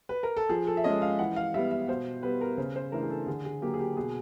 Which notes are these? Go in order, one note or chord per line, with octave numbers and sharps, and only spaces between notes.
B4
A#4
A4
F3 G#4
A4
E5
G#3 C#4 D#5
F5
E3 F#5
F5
G3 B3 E5
E5
B2 C5
G3 B3 B4
A#4
C#3 C5
C5
E3 A3 D4 A#4
G#4
A4
D3 G#4
G#4
F#3 A#3 G4
G#4
G4
B2 G#4